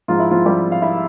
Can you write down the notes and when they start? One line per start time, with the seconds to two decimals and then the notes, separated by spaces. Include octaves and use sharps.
0.08 G#2 F3 F4
0.19 E4
0.31 F3 F4
0.46 G3 G4
0.72 F5
0.82 E4 E5